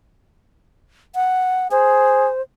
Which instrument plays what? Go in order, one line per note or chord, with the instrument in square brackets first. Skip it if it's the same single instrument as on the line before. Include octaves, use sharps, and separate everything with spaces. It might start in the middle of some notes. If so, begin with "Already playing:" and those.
[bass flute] F#5
[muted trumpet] G#4 [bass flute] C5